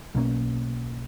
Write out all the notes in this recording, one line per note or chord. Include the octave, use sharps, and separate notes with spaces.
B1 B2 A#3 C#4